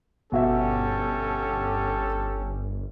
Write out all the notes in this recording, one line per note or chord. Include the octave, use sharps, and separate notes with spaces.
G1 B2 C#4 F#4 G4 A4 E5